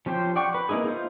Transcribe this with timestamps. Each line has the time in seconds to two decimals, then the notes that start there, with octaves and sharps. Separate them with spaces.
0.06 F3 C#4 G4 C5 G5
0.36 D5 F#5 G5 C#6
0.55 B4
0.69 A#3 C#4 D#4 E4 G#4
0.84 D#4 F4 C5